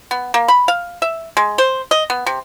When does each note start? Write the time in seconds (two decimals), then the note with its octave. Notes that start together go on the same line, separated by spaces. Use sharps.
0.11 B3
0.34 A#3
0.48 B5
0.68 F5
1.02 E5
1.37 G#3
1.58 C5
1.91 D#5
2.10 B3
2.26 C3